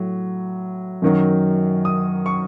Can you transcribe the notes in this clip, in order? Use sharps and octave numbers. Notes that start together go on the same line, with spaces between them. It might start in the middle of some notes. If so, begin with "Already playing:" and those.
Already playing: A2 F#3
F#2 D#3 F#3
D#6
C#6